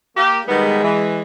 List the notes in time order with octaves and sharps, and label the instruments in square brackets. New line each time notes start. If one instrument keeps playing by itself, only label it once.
[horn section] A#3 G4
[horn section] D#3 G3 B3 [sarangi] G#3
[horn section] E3